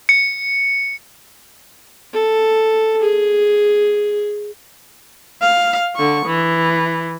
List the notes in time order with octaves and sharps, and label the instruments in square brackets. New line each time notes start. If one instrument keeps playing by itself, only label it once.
[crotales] C#7
[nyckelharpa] A4
G#4
[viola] F5
D3 C#6
E3